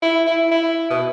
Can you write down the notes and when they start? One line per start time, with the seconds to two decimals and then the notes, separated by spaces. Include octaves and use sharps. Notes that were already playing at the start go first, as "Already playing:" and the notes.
0.02 E4
0.27 E4
0.51 E4
0.90 B2